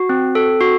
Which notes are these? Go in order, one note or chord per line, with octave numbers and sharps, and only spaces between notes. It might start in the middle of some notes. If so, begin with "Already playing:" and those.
Already playing: F#4
C4
A4
F#4